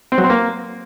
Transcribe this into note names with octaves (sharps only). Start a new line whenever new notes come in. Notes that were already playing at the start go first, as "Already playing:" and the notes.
C4
F#3
C4
A#3